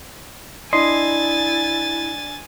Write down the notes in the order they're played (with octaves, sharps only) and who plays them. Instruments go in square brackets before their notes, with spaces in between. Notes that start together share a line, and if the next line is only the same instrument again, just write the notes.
[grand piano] D4 [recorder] E4 [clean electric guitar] D#5 C6 [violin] G#5 A6